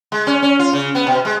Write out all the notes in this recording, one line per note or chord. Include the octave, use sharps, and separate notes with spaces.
G#3
C#4
C#4
F4
C#3
B3
B2
G#3